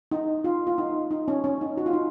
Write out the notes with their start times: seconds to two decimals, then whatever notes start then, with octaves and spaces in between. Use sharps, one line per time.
0.12 D#4
0.44 F4
0.67 F4
0.78 D#4
1.11 D#4
1.28 C#4
1.44 C#4
1.61 D#4
1.77 F#4
1.86 F4
1.93 D#4